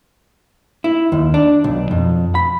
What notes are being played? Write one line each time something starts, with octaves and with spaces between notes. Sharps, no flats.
E4
D#2
D4
B1
F2
B5